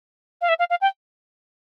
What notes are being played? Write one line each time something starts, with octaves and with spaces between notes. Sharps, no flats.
F5
E5
F5
F5
G5